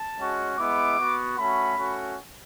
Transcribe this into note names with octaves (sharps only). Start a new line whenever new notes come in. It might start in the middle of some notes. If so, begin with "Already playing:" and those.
Already playing: A5
G#3 C#4 F#4
G#3 B3 E4 D6
B3 F#4
A3 C#4 F#4 B5
A3 C#4 F#4